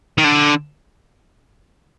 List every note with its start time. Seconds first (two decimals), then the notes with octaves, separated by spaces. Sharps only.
0.18 D#3
0.24 D3